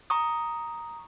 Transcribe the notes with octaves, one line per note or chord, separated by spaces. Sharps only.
A#5 C#6 D#6